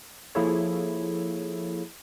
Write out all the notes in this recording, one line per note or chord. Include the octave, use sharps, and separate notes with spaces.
F3 A#3 E4 G#4 A4 C#5